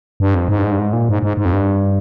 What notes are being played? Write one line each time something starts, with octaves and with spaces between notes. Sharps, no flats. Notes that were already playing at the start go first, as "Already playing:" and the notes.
G2
F2
G#2
G2
G#2
G2
G#2
A#2
G#2
G#2
G#2
F2
G2